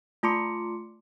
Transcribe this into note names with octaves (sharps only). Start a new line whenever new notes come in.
A3 F4 A5 C6 D6 C#7